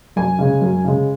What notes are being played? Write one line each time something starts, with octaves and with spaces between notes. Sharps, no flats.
F#2 G#5
C#3 G#3
F#2
C#3 G#3